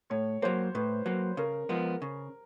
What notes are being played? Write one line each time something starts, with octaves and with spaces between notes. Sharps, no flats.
A2 C#5
F#3 A#3 C5
A2 B4
F#3 A#3
C#3 A#4
F3 G#3 B3
C#3